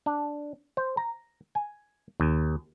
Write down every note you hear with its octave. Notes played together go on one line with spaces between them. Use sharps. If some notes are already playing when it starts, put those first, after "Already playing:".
D4
C5
A#5
G#5
D#2